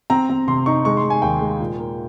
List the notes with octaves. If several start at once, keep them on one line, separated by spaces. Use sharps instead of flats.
C4 A#5
C4
C3 C6
D#4 C#6
G#3 C#6
C6
G#3
G#5
D#2 G5
G#3
A#2
A#3